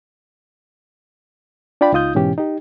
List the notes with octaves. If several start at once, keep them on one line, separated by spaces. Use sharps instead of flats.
D4 F4 D5 G5 B5
C#2 D#4 F4 D#6 G6
G#2 B2 E3 C#4 G4
D#4 G4